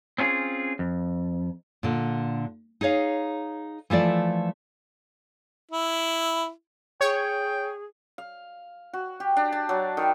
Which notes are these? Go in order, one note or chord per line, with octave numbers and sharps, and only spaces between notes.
C4 C#4 F4 G#4
F2
A#2 D3
D#4 G#4 C#5 F5
E3 F3 A3 D5
E4
G#4 C#5 G5
F5
F#4
G4
D4
A5
F#3
D#3